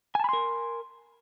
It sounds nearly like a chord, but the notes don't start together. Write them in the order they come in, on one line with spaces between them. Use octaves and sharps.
G#5 A5 B5 C6 A#4